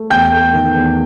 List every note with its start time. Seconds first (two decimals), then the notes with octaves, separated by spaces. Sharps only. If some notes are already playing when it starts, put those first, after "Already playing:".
Already playing: A3
0.10 E2 G5 G6
0.32 A3
0.53 D#3
0.75 E2